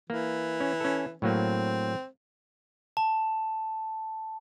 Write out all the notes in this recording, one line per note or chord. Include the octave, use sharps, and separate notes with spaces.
E3 A#3
C#4
C#4 A4
A2 F#3 A#3 C4
A5